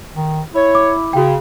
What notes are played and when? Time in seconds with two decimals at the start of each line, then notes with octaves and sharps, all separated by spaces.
0.15 D#3
0.54 E4 C#5
0.75 D6
1.13 C#3 F#4 G5